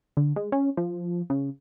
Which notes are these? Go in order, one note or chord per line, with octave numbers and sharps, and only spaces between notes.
D3
G#3
C#4
F3
C#3